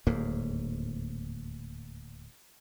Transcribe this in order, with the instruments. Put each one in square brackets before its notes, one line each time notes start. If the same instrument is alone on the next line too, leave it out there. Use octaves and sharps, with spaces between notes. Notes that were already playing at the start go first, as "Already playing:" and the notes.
[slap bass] D1 D#2 G#2 A#3